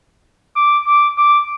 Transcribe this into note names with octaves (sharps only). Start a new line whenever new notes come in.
D6
D6
D6